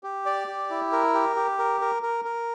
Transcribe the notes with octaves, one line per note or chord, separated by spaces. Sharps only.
G4
D5
G4
E4
A#4
G4
G4
A#4
A#4
A#4
A#4